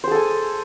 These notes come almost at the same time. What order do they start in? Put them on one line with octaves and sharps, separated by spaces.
C5 G#4 A4 G#5